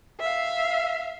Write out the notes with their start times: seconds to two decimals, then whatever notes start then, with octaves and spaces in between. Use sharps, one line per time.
0.20 E5 F5